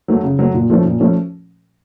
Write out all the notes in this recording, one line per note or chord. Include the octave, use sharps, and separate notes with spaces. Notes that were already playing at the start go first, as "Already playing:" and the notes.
F#3 A3
C#3
F#3 A3
A#2
F3 A3 C#4
A#2
F3 A3 C#4